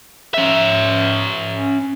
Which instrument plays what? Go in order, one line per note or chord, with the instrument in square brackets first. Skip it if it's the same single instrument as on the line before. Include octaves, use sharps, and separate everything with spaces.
[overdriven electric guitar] C#4 E5